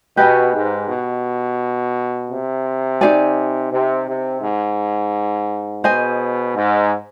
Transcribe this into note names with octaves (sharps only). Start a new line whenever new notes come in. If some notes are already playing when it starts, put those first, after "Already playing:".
B2 G4 B4 D#5 G#5
G#2
B2
C3
D#4 G#4 D5 G#5
C3
C3
G#2
B2 G#4 C5 D#5 G#5
G#2